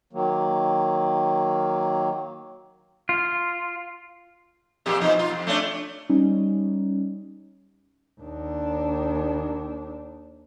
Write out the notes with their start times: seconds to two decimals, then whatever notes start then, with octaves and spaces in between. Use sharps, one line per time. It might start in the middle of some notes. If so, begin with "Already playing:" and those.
0.13 D#3 F#3 A#3
3.09 F4
4.86 F2 A#2 G4
5.01 B2 F3 D#4
5.19 F4
5.30 F2
5.47 A3 C#4 D4
6.09 G3 C#4 D#4
8.21 D#2 D4